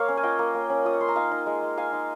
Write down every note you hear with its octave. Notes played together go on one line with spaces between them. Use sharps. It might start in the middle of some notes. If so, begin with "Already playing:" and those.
Already playing: A#3 A#4 C#5 F5
C#4
G#5
F4 D#5 G5
A#3
A#3
C#4
F4 D#6
C#6
A#3 C6
A#5
D#4 F5 G#5
D#4
G#3
G#3
D#4 F5 G#5
D#4